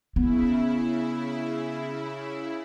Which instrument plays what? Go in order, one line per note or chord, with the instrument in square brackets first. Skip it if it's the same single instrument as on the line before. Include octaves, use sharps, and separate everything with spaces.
[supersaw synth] C#3 E4 [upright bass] B3